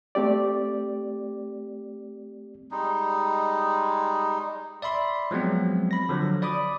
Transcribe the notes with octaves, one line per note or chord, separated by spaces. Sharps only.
A3 C4 G4 D5
G3 G#3 D#4
D5 E5 B5 C6
F3 F#3 G#3 B3 C4
B5 A#6
D3 F3 F#3
D5 B5 D6 D#6